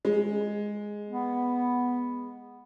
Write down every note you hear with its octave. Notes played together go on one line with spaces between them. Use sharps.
G#3
B3